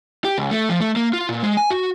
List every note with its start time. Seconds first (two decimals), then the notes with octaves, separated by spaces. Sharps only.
0.25 G4
0.38 C#2
0.51 A3
0.69 F3
0.80 A3
0.96 A#3
1.13 F4
1.29 A#2
1.43 G#3
1.57 G#5
1.70 F#4